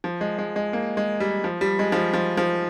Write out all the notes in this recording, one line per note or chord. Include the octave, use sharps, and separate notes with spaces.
F3
G#3
G#3
G#3
A#3
G#3
G3
F3
G3
G#3
F3
G3
F3
F3